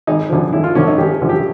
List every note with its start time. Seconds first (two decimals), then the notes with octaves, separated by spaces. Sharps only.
0.07 G#1 D#4
0.29 F#2 D3 F3
0.53 G#1 E4
0.64 F4
0.75 F#2 D3 F3 C#4
0.88 D#4
0.98 G#1 G4
1.22 F#2 D3 F3
1.29 G4